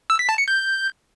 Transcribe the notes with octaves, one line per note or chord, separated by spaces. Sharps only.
E6
B6
A5
C#7
G6